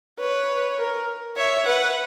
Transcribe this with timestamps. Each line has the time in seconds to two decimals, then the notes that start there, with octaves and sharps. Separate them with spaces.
0.20 B4 C#5
0.78 A#4
1.37 C#5 E5
1.66 B4 F#5